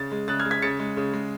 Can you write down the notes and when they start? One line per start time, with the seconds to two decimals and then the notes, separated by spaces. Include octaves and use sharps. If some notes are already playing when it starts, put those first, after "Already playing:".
Already playing: C#3 A6
0.12 G#3
0.28 C#3 F#6 A6
0.40 F6 G#6
0.45 G#3
0.51 G#6 B6
0.62 C#3 A6 C#7
0.79 G#3
0.97 C#3
1.13 G#3